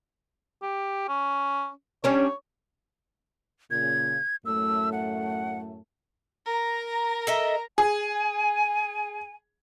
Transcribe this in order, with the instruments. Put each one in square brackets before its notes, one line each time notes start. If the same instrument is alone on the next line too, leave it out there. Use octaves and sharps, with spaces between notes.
[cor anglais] G4
C#4
[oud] G3 C#4 D4 [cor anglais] C#5
[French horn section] A#2 C#3 [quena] G#6
[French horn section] F#2 A2 A3 [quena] E6
[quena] F#5
[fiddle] A#4 A#5
[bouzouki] A4 D#5 E5
[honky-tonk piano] G#4 [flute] G#5